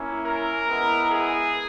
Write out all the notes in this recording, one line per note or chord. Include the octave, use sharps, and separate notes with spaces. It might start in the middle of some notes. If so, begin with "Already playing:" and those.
Already playing: A#3 C#4 E4
A#4
G#3 B3 E4
G#4